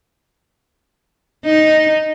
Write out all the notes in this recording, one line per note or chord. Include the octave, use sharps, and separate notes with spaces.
D#4